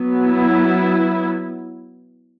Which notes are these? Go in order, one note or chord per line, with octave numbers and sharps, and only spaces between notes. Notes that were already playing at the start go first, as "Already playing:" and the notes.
Already playing: F#3 B3
E4